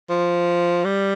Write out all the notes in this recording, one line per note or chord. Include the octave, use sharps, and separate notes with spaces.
F3
G3